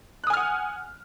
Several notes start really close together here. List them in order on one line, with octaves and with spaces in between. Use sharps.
F#6 D#6 G#5 F6 F#5